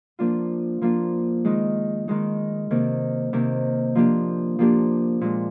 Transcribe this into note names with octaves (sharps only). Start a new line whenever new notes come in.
F3 A#3 D4 F4
F3 A#3 D4 F4
D#3 G#3 D#4
D#3 G#3 D#4
C3 D#3 A#3
C3 D#3 A#3
F3 A#3 D4 G4
F3 A#3 D4 G4
A#2 G#3 D4